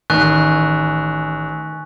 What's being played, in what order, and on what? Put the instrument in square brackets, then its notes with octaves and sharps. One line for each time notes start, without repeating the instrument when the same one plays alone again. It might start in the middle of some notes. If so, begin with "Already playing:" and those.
[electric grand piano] A1 [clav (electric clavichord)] D#3 [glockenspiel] G#5 C#6 F#6